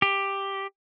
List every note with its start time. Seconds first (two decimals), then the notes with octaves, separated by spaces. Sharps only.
0.02 G4